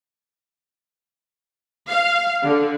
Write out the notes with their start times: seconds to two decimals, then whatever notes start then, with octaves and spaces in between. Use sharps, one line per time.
1.88 F5
2.44 D3